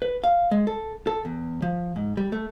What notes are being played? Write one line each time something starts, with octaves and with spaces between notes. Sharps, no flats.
B4
F5
G#3
A4
A4
E2
F3
G#2
G3
A3